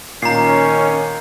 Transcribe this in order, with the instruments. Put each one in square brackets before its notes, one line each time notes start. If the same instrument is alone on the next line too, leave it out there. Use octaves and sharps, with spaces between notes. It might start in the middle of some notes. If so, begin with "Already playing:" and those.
[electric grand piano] A#2 [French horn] D#3 [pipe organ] C#4 [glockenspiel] A#5 C7